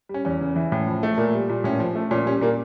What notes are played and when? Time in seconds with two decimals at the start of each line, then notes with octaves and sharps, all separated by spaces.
0.09 G3
0.14 C#4
0.25 E2 C#4
0.41 C#3
0.56 E3
0.72 A2
0.87 F3
1.03 A3
1.18 A#2 A#3
1.34 G3
1.49 A#2
1.64 A2 C#4
1.80 F3
1.95 A3
2.11 A#2 C#4
2.26 G3 C#4
2.41 A#2 A#3